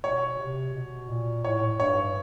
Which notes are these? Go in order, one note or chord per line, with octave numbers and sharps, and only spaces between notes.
B2 C#5
C3
B2
A#2
A2 C#5
G2 C#5